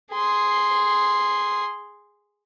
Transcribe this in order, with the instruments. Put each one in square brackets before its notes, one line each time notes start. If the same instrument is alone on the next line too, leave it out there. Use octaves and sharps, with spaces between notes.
[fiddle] G#4 C6